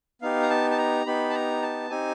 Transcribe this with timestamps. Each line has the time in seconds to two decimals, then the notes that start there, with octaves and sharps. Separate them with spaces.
0.22 B3 D#4 G4 F5
0.42 A#5
0.50 A5
0.71 A5
0.78 A#5
1.06 B3 D#4 G4 B5
1.30 A5
1.34 A#5
1.62 A5
1.90 C4 D#4 G4 G#5